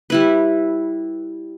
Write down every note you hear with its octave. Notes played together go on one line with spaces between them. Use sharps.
G3 E4 B4